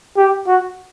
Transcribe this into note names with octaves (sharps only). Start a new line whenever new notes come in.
G4
F#4